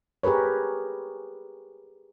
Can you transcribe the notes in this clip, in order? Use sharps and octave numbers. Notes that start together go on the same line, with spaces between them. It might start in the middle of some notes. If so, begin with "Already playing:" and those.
G4 G#4 A#4 B4 C#5